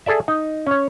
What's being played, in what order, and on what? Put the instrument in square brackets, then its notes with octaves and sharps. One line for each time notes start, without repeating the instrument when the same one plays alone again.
[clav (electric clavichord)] G#4 A4 D5 E5
D#4
C#4 C#5